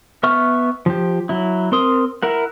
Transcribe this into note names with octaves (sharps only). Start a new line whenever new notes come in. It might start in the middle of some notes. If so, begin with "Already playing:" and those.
B3 E5 C#6 F6
F3 G4
F#3 E4
C4 A#4 C6 D#6
E4 A#4 F#5